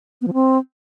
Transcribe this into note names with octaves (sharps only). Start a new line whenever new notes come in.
B3
F3
C4